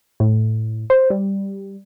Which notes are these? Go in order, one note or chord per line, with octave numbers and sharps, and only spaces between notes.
A2
C5
G3